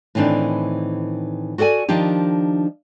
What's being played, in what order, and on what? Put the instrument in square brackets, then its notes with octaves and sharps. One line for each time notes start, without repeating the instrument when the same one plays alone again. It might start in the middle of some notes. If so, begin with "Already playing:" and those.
[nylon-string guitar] A2 D#3 E3 C4 D4
F#4 A4 D5 F#5 G#5
D#3 F3 D4 D#4 G4